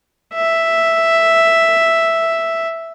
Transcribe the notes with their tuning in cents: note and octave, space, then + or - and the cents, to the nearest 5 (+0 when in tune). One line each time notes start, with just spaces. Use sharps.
E5 +0